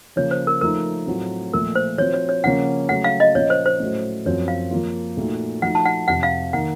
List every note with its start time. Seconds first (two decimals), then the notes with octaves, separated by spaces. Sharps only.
0.16 C#3 F3 A#3 C#5
0.31 C5
0.47 A#4
0.61 F3 A3 D#4 A#4
1.07 A2 F#3 A3 C4 F4
1.53 A#2 F3 A3 A#4
1.75 C5
1.98 F3 C4 F#4 C#5
2.14 C#5
2.29 C#5
2.44 C#3 F3 A#3 C#4 F#5
2.89 C#3 F#3 A3 F#5
3.04 F5
3.20 D#5
3.35 A#2 F3 A#3 C#4 C#5
3.50 C5
3.66 C5
3.80 A2 F#3 A3 C#4 F#4
4.25 F#2 F3 C4 F#4 C#5
4.48 F5
4.71 F3 A#3 F4
5.17 A#2 A3 D#4 F#4
5.62 F3 A3 D#4 F#4 F#5
5.75 A5
5.86 F#5
6.08 F2 C3 F3 C4 F#5
6.23 F5
6.53 D#3 A#3 D#4 F#5